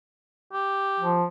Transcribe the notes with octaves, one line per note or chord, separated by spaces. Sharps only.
G4
F3